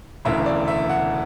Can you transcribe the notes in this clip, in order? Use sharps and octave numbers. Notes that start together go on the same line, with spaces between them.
E1 D2 C#3 E3 E5
D5
E5
F#5